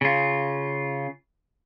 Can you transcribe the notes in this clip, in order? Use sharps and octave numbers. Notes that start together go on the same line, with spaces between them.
C#3 F4